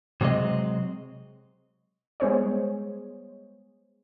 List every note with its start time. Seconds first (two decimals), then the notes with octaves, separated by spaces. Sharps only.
0.21 C3 F#3 G#3 C4 D#5
2.20 G3 G#3 B3 G#4 C5 C#5